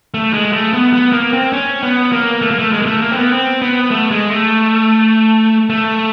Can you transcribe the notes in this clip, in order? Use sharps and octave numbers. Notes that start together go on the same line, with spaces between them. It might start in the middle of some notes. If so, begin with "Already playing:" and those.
A3
G#3
A3
B3
B3
A#3
C4
C#4
B3
A#3
A3
A#3
A3
G#3
A#3
A3
A#3
C4
B3
C4
B3
A3
G#3
A3
A3